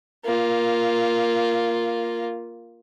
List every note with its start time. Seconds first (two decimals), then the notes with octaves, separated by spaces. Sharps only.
0.25 A#3 F4